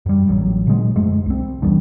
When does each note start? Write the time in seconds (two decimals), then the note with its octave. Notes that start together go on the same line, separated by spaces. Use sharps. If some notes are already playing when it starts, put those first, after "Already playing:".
0.06 F#2 G3
0.27 A1 A2 C#3 F#3
0.67 A#2 D3 F#3 G#3
0.96 F#2 F3 G#3 A3
1.26 C2 C4
1.62 E2 E3 G3 D4